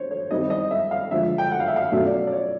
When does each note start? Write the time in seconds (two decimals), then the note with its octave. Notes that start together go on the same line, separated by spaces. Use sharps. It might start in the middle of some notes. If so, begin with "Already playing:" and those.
Already playing: D4 C5 C#5
0.11 C#5
0.30 D#3 G3 C4 E4 D#5
0.50 D#5
0.71 E5
0.91 F5
1.11 D3 F3 G#3 E5
1.38 G5
1.51 F#5
1.60 F5
1.68 E5
1.76 F5
1.92 B2 F#3 A3 C#4 F4 E5
2.06 D5
2.27 D5
2.32 C#5